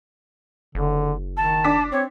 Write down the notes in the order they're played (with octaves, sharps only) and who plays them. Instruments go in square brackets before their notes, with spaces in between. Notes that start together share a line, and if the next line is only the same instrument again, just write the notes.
[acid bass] F#1 [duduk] D3
[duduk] D#3 [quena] A5
[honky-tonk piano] D4 D6 B6
[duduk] C4 [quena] C#5